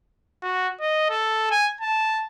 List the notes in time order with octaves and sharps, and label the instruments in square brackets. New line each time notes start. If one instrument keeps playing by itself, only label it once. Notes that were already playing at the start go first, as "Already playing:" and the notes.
[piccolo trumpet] F#4
D#5
A4
G#5
A5